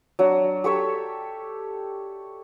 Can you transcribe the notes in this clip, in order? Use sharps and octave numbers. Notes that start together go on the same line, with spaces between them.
F#3 D4
G4 A4 C#5 E5